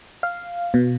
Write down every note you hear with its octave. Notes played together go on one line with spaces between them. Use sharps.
F5
B2